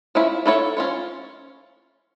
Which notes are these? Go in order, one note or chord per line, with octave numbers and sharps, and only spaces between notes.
F3 C#4 E4
A3 E4 A4 C#5
F3 C#4 F4 C#5